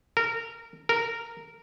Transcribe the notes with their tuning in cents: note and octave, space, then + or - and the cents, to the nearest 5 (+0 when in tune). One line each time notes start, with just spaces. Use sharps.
A#4 -20
A#4 -10